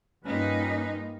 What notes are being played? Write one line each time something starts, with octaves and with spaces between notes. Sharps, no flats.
G2 G3 A#3 C#4 D#4 F4 B4